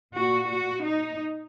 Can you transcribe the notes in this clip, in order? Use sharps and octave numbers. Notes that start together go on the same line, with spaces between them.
A#2 F#4
F#4
D#4